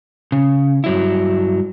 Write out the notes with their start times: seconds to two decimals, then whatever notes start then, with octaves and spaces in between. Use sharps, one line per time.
0.32 C#3
0.84 G2 F#3 E4